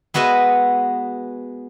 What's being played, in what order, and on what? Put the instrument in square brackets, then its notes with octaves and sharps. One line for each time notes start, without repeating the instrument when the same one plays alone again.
[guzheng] G#3 B3 F#4 D#5 E5